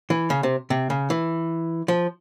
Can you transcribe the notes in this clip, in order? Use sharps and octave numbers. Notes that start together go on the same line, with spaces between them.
E3
C#3
C3
C3
C#3
E3
F3